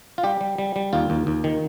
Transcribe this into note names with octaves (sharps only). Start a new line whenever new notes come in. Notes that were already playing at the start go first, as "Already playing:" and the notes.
F4
G3 G4
G3
G3
G3
D#2 F4
D#2
D#2
D#3